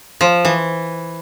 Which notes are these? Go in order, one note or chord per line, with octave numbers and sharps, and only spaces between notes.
F3
E3